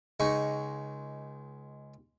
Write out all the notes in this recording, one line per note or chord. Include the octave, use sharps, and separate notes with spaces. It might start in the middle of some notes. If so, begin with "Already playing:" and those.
C#2 G#3 D#4 C#6